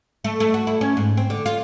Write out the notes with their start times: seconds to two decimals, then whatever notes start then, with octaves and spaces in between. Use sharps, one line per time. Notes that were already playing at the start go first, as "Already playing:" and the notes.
0.24 A3
0.40 A3
0.54 F#4
0.67 E4
0.81 C#4
0.97 G#2
1.17 C4
1.30 D3
1.46 F4